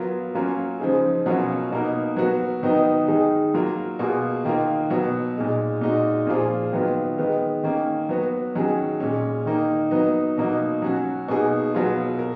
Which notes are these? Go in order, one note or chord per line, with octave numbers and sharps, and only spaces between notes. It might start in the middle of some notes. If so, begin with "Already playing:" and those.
Already playing: F#3 B3 F4 A#4
F#3 A#3 C#4 F4 A#4
C#3 F3 G#3 D#4 G#4
B2 F#3 C#4 F4 A#4
B2 A#3 D#4 A#4
F#3 B3 F#4 A#4
D#3 F#3 B3 D#4
D#3 G#3 D#4 G#4
F#3 A#3 F4 A#4
B2 A#3 F4 G#4
D#3 A#3 F4 A#4
B2 F#3 B3
A#2 G#3 D#4
A#2 G#3 D#4 F#4
A#2 F3 A#3 F4 G#4
D#3 F#3 B3 F4
D#3 G#3 B3
D#3 A#3 C#4
F#3 B3 F#4
D#3 F#3 C#4 G#4
A#2 G#3 C#4
D#3 A#3 D#4 A#4
F#3 B3 D#4
B2 F#3 A#3 D#4
F#3 C#4 F#4
B2 A#3 D#4 G#4
B2 F#3 B3 F4 G#4
A#4